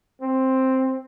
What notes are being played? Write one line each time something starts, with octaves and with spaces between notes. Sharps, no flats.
C4